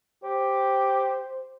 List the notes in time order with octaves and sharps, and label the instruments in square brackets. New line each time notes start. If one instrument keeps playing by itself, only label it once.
[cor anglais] G4 [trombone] C5